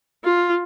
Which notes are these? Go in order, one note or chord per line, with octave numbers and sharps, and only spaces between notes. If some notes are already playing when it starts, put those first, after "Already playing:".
F4